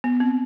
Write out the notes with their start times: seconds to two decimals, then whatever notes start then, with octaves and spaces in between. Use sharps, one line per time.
0.04 B3
0.20 C4